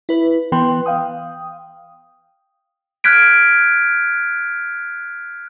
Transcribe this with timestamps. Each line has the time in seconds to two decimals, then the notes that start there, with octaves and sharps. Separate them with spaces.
0.09 E4 B4
0.52 E3 B3 B4 G5 C6
0.86 F5 G5 D#6
3.04 F6 F#6 G#6 B6 D7